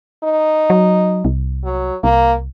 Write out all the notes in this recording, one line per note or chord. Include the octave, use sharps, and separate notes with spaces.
D#4
F#3
C2
F#3
C2 A#3